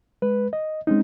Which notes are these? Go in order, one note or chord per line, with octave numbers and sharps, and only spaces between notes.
G#3 B4
D#5
G#3 C4 C#4 D#4